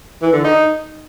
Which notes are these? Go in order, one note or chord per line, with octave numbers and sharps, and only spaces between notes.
E3
D3
D#4